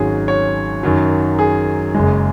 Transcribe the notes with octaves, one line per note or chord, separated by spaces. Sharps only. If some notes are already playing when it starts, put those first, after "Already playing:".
Already playing: G#1 G#2 F#3 C#4 G#4
C#5
F#2 D#3 F#3
G#4
F#1 F#2 C#3 G#3